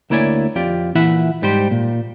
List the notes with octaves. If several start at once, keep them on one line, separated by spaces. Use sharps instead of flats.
D2 A#3 E4 C#5 D5 G#5
F2 F4 G4 D5
A#2 E3 E4 E5 F#5
G#2 G3 G4 C5
A#2